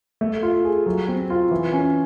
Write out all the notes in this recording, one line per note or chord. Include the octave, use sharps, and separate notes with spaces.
A3
F4
G#4
F#3
C4
F4
E3
C#4